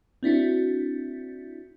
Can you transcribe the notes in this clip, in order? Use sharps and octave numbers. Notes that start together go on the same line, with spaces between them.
C4 D4 E4 F#4